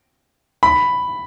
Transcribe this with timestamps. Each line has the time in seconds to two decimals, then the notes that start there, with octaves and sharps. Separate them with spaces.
0.63 B5